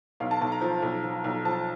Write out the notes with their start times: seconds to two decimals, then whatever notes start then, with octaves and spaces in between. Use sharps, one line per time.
0.20 B1 F5
0.31 A5
0.41 B1 A5
0.52 A#5
0.61 F3
0.82 B1
1.04 F3
1.24 B1
1.45 F3 A5